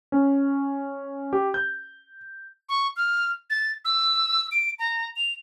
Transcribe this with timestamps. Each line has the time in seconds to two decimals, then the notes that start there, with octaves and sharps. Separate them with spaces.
0.12 C#4
1.33 G4
1.54 G6
2.69 C#6
2.96 F6
3.50 A6
3.85 E6
4.52 D7
4.79 A#5
5.16 F7